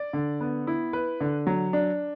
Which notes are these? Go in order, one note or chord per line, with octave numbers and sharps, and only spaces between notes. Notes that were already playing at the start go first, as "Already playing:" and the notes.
Already playing: D5
D3
B3
E4
B4
D3
F#3
D4